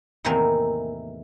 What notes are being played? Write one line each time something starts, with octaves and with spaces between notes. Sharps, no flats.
E2 A2 C3 D#3 E3 A#3